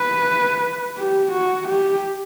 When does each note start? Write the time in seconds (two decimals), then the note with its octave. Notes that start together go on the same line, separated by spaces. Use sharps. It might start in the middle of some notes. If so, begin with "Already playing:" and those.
Already playing: B4
0.98 G4
1.32 F#4
1.68 G4